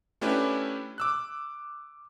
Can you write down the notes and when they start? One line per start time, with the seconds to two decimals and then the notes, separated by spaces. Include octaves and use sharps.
0.21 A3 C#4 D4 E4 G4 B4
0.98 D6 E6 F#6